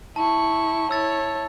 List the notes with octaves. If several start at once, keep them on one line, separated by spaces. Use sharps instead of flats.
E4 A5 C#6
E4 C#5 E6 A6